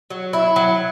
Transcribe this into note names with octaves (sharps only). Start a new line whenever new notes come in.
F#3
E4
F#3